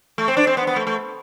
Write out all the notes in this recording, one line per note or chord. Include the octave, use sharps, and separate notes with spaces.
A3
C4
D4
C4
B3
B3
A3
A3